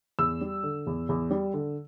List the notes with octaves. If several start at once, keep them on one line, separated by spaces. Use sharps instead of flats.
E2 E6
G3
D3
E2
E2
G3
D3